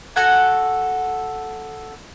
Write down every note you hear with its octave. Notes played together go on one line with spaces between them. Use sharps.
F#4 A4 F#5 G#5